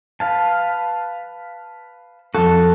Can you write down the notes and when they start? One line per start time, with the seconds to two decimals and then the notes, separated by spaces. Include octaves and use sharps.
0.20 B4 F5 A5
2.35 F2 F#4 A4 A5